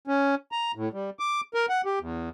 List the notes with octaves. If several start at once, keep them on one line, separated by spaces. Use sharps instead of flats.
C#4
A#5
A2
G3
D6
A#4
F#5
G4
E2